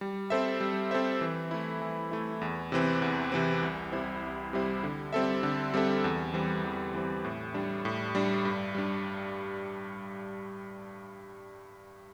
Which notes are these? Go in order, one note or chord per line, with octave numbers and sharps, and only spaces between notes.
G3
C4 A4 C5 E5
G3
C4 A4 C5 E5
E3
A3 E4
E3
A3 E4
E2
C3 E3 C4
E2
C3 E3 C4
C2
C3 G3 E4 C5
C2
C3 G3 E4 C5
D3
G3 C4 A4 E5
D3
G3 C4 A4 E5
E2
E3 G3 C4
E2
E3 G3 C4
A2
G3 D4
A2
G3 D4
G2
G3 D4